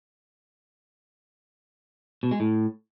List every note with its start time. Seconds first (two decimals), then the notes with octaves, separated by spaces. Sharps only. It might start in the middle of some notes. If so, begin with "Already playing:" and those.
2.23 B2
2.31 G#3
2.40 A2